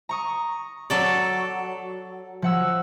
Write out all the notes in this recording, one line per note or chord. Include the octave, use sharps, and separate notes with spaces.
A#5 C#6 D#6
F#3 A4 D5
F3 F#5 E6